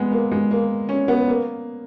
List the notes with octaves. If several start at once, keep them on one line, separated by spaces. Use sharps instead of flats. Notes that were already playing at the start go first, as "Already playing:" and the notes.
Already playing: G#3 B3
A#3
G#3
A#3
C#4
B3
A#3